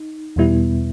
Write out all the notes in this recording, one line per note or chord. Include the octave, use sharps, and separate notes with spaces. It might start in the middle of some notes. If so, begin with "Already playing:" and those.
Already playing: D#4
E2 B2 G3 B3 E4